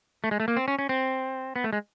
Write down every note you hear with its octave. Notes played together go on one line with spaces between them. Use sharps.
A3
G#3
A3
A#3
C4
C#4
C#4
C4
B3
A3
G#3